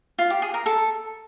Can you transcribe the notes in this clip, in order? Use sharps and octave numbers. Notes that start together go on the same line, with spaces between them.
F4
G4
G#4
A#4
A4